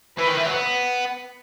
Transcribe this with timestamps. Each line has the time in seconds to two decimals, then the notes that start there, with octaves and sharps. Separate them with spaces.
0.19 E3 B4
0.27 D#3
0.37 E3
0.46 F#3
0.54 B3